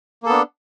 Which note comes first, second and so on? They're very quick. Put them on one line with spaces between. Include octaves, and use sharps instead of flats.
A#3 A4 B3 D4